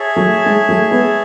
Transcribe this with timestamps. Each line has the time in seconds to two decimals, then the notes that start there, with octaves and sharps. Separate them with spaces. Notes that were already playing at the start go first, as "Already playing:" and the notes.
Already playing: G#4 C#5 E5 A5
0.16 F#3 A3
0.46 G#3
0.69 F#3 A3
0.91 G#3 B3